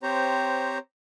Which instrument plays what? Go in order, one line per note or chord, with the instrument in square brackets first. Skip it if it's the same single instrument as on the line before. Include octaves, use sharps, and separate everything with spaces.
[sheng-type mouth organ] C4 G4 C5 C#5 A#5